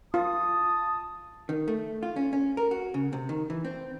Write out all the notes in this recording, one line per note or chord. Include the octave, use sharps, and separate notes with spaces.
F4 A5 D#6
D#3
A3
F4
C#4
C#4
A#4
F#4
C#3
C3
D#3
E3
C4